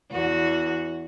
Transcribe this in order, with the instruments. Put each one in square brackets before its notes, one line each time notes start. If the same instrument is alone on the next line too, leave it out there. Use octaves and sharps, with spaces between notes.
[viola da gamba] E2 F#4